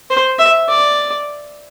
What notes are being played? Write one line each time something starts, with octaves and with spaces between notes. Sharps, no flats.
C5
E5
D5